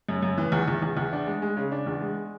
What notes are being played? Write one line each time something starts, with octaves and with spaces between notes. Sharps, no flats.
F#2
F#2
E3
E2
E2
E2
E2
D4
G#3
G#3
C#3
D4
E2
G#3